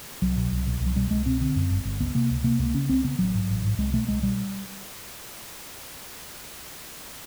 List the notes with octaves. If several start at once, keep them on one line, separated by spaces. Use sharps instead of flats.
C2 F#3
B2
C2
B2
C2
F#3
B2 G3
C2 G#3
B2 C4
D3 C4
F#2
G1
G1
C#2 B3
C3 A#3
C#2
C3 A#3
C#2 A#3
C#3 C#4
C#2 C4
C#3 B3
A1 F#3
G#2
A1
G#2
C2 G#3
B2 A3
C2 G#3
B2 G3